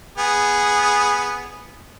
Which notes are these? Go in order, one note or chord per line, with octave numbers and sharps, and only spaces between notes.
B3 G#4